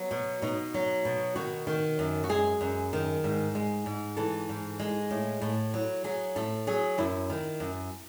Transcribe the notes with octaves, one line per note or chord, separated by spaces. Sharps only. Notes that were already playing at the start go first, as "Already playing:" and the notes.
Already playing: F#3 B3
B2
B2 D#4
F#3
B2
D#3 F#4
D#3
F#2
F#4
G#3 G#4
F#2
D#3
G#2
G#3
G#2
E3 A4
G#2
G#3
A2
A2
F#3
F#3 G#4
A2 A4
F#3 G#4
F#2 E4
D#3
F#2